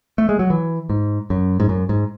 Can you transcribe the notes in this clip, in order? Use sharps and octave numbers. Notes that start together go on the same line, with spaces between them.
A3
G#3
F#3
E3
G#2
F#2
G#2
F#2
G#2